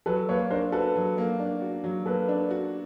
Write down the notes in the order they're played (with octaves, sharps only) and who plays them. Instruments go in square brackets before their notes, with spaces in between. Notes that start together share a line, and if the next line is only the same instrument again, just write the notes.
[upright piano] F#3 [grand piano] A4 B4
[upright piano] A#3 [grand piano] B4 C#5
[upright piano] D4 [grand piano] A#4 C5
[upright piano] F#4 [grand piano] A4 B4
[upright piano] F#3
A#3
D4
F#4
F#3
[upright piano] A#3 [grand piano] A4 B4
[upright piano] D4
F#4